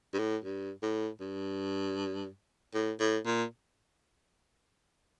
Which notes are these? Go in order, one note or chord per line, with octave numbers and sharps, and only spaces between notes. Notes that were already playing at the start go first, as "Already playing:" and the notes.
G2
A2
G2
A2
G2
A2
A2
A#2